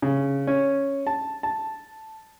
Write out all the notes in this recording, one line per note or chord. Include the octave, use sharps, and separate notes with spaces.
C#3
C#4
A5
A5